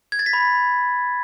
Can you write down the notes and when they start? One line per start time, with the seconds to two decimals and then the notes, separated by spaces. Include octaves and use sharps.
0.12 G#6
0.19 A6
0.26 B6
0.33 B5